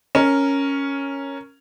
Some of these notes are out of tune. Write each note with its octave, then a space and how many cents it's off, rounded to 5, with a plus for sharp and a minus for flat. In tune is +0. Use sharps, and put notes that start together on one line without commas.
C#4 +0 A#4 +0